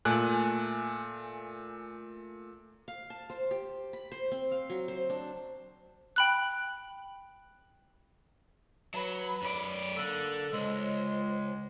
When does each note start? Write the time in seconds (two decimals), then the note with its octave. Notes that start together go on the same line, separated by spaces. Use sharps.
0.05 A#2 A3 G#5 F#6
2.88 F5
3.10 A5
3.30 C5
3.51 G4
3.93 B5
4.12 C5
4.32 C4
4.51 F5
4.70 F#3
4.88 C5
5.10 D4
6.16 G5 B5 F#6
8.94 F#3 B4 B5
9.42 F#2 D5
9.97 D3 A#3 A4 F#6
10.53 C#2 G#3 C5